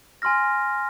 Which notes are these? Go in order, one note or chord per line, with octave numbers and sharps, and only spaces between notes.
G#5 C6 F6 A#6